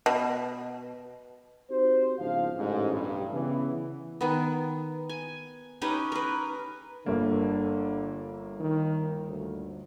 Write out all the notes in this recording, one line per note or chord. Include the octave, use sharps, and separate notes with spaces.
B2
C4 D#4 F#4 G4 C5
A#1 E2 G#2 C#3 F3 F5
A1 G#2
B1 G2
C#3 E3 B3
D#3 B3
G#5
C#4 D#4 G4 B4
A#4 B4
G1 D3 A#3
D#3
D2